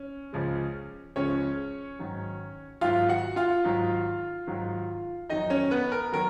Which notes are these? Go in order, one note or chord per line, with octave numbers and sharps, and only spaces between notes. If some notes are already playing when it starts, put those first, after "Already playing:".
Already playing: C#4
C#2 C#3 F3 G#3
C#2 C#3 F3 G#3 C#4 C#5
G#2 D#3 F#3
G#2 D#3 F#3 F4 F5
F#4 F#5
F4 F5
G#2 D#3 F#3
G#2 D#3 F#3
F2 D#3 F#3 D#4 D#5
C#4 C#5
B3 B4
A#4
D#3 F#3 A#4